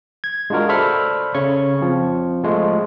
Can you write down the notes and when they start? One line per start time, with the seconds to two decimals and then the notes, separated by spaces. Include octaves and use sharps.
0.24 G#6
0.50 G#3 D4 F4 F#4 A#4
0.69 A4 C5 D5 E5 B5 F6
1.35 C#3 C#5 C#6
1.81 F3 C4
2.44 F3 G#3 A3